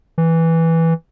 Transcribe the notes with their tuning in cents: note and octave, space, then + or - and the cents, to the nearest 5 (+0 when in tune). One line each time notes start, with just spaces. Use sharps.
E3 -5